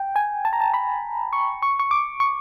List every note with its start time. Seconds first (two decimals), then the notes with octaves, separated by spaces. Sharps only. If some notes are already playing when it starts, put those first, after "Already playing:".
Already playing: G5
0.16 G#5
0.45 A5
0.53 A#5
0.60 A5
0.74 B5
1.33 C#6
1.62 C#6
1.79 C#6
1.91 D6
2.20 C#6